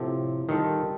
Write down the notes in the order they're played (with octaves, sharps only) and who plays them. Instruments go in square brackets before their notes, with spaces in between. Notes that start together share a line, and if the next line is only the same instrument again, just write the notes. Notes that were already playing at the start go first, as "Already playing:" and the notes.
Already playing: [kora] A2 F3 C4 [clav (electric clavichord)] C3
[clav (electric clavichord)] D#3 [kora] G3 D4 F4 A4